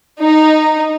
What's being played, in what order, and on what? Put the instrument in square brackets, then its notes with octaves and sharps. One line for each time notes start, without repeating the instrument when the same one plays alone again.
[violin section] D#4